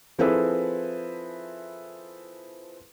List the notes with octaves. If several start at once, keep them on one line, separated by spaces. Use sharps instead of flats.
F3 C4 E4 G#4 A4 B4